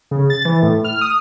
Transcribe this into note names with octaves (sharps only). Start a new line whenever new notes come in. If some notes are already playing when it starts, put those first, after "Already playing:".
C#3
A6
E3
A2
F6
D#6